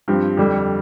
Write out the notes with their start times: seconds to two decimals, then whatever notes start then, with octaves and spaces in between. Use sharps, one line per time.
0.08 G2 F3 C4 G4
0.37 F2 D3 G3